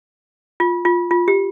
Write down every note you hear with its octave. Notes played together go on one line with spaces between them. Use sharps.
F4
F4
F4
G4